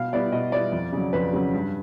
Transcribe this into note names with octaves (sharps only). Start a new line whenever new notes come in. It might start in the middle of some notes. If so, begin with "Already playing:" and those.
Already playing: B2 F5
G3 B3 E4 D5
B2 D#5
G3 B3 E4 D5
F2
C#3 F#3
F2 B4
C#3 F#3
G2